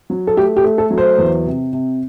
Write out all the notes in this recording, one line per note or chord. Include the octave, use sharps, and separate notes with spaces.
F#3
A4
A3 G4
G4
A3
A4
F#3
C5
E2
C3
C3